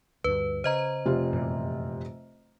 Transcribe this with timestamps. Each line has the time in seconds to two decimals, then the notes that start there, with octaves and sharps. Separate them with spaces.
0.24 D2 G2 B4
0.64 C#3 C5 D#5 A#5
1.06 F1 C3 F4
1.33 F#2 A#2 E3